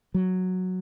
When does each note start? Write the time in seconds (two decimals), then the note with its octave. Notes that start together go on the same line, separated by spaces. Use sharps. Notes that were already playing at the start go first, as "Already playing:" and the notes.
0.14 F#3